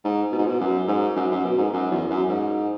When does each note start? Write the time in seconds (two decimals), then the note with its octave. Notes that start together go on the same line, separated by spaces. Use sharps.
0.04 G#2
0.32 B2
0.38 G#2
0.46 B2
0.60 F#2
0.88 G#2
1.16 F#2
1.31 F#2
1.44 B2
1.58 G#2
1.73 F#2
1.91 E2
2.10 F#2
2.29 G#2